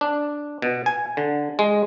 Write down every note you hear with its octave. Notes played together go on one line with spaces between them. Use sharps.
D4
B2
G#5
D3
G#3